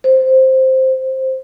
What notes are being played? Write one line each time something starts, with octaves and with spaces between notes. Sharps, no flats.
C5